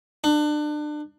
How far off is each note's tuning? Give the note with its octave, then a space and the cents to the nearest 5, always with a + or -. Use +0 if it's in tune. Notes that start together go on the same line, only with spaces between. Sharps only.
D4 +30